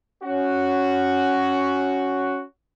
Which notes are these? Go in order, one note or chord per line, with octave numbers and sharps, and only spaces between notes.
C#4 F#4